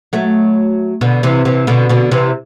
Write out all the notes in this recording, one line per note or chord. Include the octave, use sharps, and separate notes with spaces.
F#3 A3
B2 D3
C3 E3
C3 E3
B2 D3
B2 D3
C3 E3